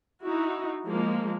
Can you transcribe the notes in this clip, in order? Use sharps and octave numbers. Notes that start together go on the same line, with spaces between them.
D#4 E4 F#4
F3 G#3 A#3